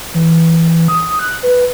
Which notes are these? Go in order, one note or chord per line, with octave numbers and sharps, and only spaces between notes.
E3
D#6
F#6
B4